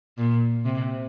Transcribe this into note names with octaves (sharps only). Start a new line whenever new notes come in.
A#2
C3